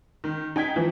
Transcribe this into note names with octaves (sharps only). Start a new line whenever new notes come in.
D#3
D#4 G5 G#6 B6
E3 F3